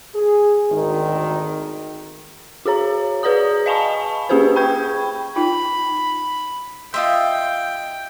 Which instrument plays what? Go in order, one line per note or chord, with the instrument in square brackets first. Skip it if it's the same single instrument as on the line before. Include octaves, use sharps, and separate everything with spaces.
[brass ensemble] G#4
G#1 D2 D#3
[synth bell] F#4 G#4 C#5 A#5
G#4 B4 D5 A#5 D#6
D#5 F5 G#5 A5 B5 C#6
A#3 C#4 G4 G#4 B4 C5
G5 B5 C#6 G6 G#6
[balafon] D#4 F4 G5 [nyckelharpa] B5
[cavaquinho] F4 D#5 E5 [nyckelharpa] G5 [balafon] C6